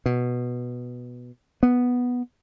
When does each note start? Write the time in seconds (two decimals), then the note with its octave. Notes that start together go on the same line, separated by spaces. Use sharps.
0.06 B2
1.63 B3